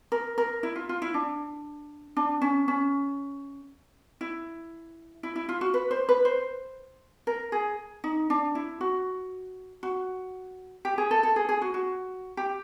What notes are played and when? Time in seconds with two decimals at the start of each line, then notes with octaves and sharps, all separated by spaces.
0.12 A#4
0.38 A#4
0.63 E4
0.76 F4
0.89 F4
1.02 E4
1.14 D4
2.17 D4
2.42 C#4
2.68 C#4
4.21 E4
5.23 E4
5.36 E4
5.49 F4
5.61 F#4
5.74 B4
5.91 C5
6.09 B4
6.25 C5
7.27 A#4
7.52 G#4
8.04 D#4
8.30 D4
8.55 E4
8.81 F#4
9.83 F#4
10.85 G4
10.98 G#4
11.11 A4
11.23 A4
11.36 G#4
11.49 G#4
11.62 F#4
11.74 F#4
12.37 G4